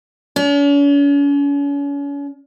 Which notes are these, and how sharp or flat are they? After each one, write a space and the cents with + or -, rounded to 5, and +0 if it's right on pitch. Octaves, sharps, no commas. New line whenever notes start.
C#4 +40